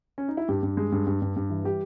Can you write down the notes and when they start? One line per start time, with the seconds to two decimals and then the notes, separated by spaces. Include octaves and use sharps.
0.18 C#4
0.28 D#4
0.37 E4
0.49 G2 G4
0.63 G2
0.77 G#3
0.92 G2
1.07 G2
1.22 G2
1.36 G2
1.50 E3
1.64 G3 G4